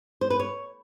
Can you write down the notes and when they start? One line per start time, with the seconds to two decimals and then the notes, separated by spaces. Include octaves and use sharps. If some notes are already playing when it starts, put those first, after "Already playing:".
0.21 C5
0.30 B4
0.39 C#5